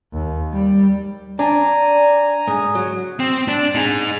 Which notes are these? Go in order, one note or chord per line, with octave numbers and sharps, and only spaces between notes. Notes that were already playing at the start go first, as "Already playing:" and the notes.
D#2
G3
D4 D5 G#5 A#5
G#2 D#6
F#3
C4
D4
D#4 G#4